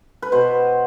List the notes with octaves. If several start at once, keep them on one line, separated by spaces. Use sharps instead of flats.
B4
B2 C5